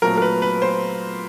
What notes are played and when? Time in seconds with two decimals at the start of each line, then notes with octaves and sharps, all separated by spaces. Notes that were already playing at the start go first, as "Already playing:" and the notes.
0.02 A#2 F#3 A3 C4 A#4
0.17 A#4
0.22 B4
0.42 B4
0.62 C5